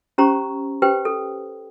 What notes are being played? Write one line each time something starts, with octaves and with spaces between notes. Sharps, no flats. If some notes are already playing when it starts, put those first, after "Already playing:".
C#4 G4 C5 A#5 C#6
G4 B4 C5 G5
A4